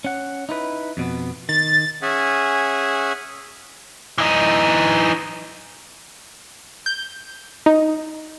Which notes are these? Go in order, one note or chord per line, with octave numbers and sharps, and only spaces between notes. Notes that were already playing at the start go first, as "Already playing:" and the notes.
C#4 F#5
D#4 E4 B4
F2 B2 B3
D#3 A6
C#4 G#4 E5 F#5 G#5
E3 D#4
G6
D#4